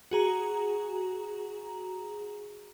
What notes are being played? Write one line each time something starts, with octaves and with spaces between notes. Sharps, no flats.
F#4 G#4 A#5